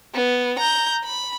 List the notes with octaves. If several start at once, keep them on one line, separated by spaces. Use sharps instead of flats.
B3
A#5 G6
B5